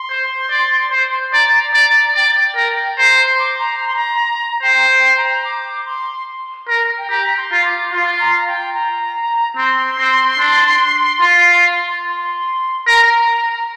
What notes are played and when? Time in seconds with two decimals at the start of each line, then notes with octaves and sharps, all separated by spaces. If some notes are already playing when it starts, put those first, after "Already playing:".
Already playing: C6
0.10 C5
0.50 D5
0.91 C5
1.33 D5 A#5
1.74 D5
2.15 D5 G5
2.56 A#4
2.98 C5 A#5
3.18 C6
3.39 D6
3.59 A#5
3.80 A#5
3.88 C6
3.96 A#5
4.63 C5 G5
4.90 G5
5.17 A#5
5.45 D6
5.86 C6
6.69 A#4
6.98 G5
7.10 G4 A#5
7.38 C6
7.52 F4
7.65 D6
7.92 F4 C6
8.19 A#5
8.36 A#5
8.48 G5
8.74 A#5
9.57 C4 C6
9.99 C4
10.39 D4
11.22 F4
12.04 C6
12.87 A#4 A#5